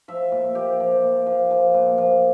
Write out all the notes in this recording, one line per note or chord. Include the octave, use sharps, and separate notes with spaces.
F3 E5
A#2
F3 G4
F3
A#2
F3
F3
A#2
F3